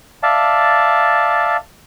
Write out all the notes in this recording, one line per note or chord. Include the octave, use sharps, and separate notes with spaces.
D5 E5 F5 A5